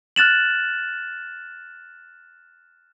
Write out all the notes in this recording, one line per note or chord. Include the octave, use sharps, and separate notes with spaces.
F6 F#6 A6 E7 F#7